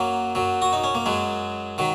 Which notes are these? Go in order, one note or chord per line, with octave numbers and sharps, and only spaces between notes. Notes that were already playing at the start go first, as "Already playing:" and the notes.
Already playing: F#2 F#3 A#3
F#2 F#3
F#4
D#4
C#4
A#3
F#2 F#3 G#3
D#3 F#3